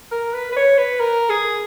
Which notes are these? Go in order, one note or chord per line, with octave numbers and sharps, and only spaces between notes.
A#4
B4
B4
C#5
B4
A#4
G#4